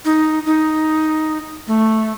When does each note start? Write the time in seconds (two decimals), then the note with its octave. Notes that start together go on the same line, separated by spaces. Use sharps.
0.05 D#4
0.46 D#4
1.68 A3